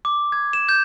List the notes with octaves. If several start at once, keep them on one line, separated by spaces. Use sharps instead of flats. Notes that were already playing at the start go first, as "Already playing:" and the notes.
D6
G#6
E7
G6